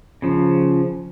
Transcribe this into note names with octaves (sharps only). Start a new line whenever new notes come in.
C#3 F3